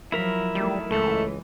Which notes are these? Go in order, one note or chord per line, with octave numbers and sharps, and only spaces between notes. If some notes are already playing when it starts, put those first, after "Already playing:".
F3 F#3 E4 A#4 B5
D#3 F#3 G3 A3
C#2 E3 G#3 A3